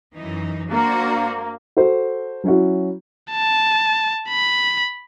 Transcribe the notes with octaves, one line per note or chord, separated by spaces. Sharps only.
F#2 E3 D#4
A#3 D4 F#4 C5
F#4 A4 C5
F#3 C#4 E4 F#4
A5
B5